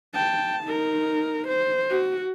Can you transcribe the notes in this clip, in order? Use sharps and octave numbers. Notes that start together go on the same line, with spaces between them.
G5 A5
D#4 A#4
C5
F#4